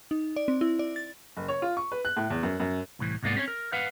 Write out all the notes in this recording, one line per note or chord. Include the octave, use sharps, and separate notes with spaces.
D#4
D5
C4
E4
D5
A6
F#1
C#5
F4
C#6
B4
F#6
A2
E2
F#2
F#2
C2 A2 E3
C2 G#2 G#3 A#3 B3 D5
C4 C#4 A#4 C#5
A#4
B4 F5 F#5